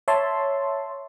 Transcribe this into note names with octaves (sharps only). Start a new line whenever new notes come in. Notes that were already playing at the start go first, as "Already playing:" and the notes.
C#5 E5 A5 C6